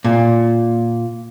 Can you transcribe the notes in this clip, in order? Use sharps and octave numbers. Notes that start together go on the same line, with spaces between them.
A#2